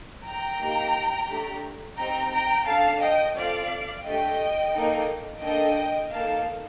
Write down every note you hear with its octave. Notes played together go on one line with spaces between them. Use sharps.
G5 A#5
A#3 D#4 G4
A3 D4 G4
C4 D#4 G4 G5 A#5
G5 A#5
D4 A4 F5 A5
D#5 G5
C4 F4 A4 D5 F5
A3 D4 G4 D#5 G5
A#3 D#4 A4
A#3 D4 A4 D#5 G5
A#3 D#4 A4 F5 A5